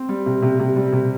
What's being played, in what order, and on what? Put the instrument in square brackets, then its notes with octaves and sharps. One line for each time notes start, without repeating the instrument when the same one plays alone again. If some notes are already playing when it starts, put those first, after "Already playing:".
Already playing: [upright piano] C4
G3
C3
C3
C3
G3
C3